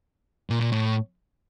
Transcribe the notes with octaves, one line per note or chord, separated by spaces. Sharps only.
A#2
A#2
A2